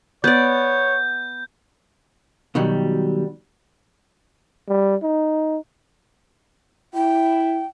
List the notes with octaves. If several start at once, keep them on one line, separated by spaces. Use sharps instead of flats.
B3 C#5 D5 G6
B2 D#3 F#3 G3
G3
D#4
E4 G5